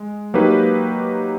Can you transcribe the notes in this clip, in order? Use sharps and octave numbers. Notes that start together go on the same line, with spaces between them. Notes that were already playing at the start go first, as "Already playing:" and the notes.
Already playing: G#3
F#3 A#3 D#4 G4 B4